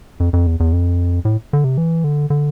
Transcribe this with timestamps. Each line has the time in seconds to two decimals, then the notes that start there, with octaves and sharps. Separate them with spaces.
0.20 F2
0.33 F2
0.47 E2
0.60 E2
0.72 F2
1.25 A2
1.53 D3
1.64 C3
1.78 E3
2.04 D3
2.30 D3